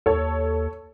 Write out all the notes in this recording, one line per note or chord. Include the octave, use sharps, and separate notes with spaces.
D#2 A4 C#5